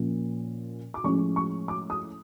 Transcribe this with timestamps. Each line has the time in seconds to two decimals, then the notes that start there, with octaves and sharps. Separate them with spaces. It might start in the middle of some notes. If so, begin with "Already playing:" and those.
Already playing: A#2 F3 A#3 C#4
0.94 D6
1.04 A2 F3 G#3 C#4 C#6
1.36 C#6
1.68 D6
1.90 D#6